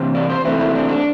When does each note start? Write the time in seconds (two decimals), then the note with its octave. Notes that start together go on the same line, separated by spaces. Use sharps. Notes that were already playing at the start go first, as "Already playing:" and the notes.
Already playing: C3 E3 C4
0.15 D5
0.30 C5
0.44 C3 E3 A3 C4 E4
0.59 E4
0.75 D4
0.89 D4